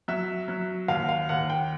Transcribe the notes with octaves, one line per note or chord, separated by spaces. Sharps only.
F#3 E5
F#3
D#2 F5
F5
D#2 F#5
G5